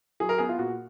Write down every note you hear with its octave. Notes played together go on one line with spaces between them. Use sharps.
F#3 G#4
A#4
B3 G#4
F4
A#2 F#4